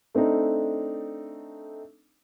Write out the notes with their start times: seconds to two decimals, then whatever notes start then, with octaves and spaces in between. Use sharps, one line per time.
0.15 A3 C4 D4 D#4 A4